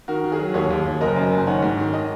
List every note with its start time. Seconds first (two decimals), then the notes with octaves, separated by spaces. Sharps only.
0.08 D#3 F#4 A#4
0.24 D#3
0.32 G#4
0.39 F#3
0.54 D#2 G#4 C#5
0.70 D#2
0.85 D#2
1.01 F#1 A#4 D#5
1.16 F#2
1.32 F#1
1.38 G#5
1.47 D#3 C#5 F#5
1.62 G#2
1.78 D#3
1.93 D#5 G#5